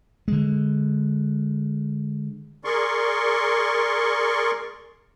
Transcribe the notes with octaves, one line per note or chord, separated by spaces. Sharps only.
D3 G#3
G#4 A#4 D5 C6 C#6